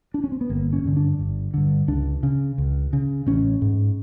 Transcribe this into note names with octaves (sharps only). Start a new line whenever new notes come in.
D4
C#4
C4
B3
G1 A#3
C#4
G2 D3
D4
G1
G2 D3
C#2 D4
C#3
C#2
C#3
A1 C#4
G#2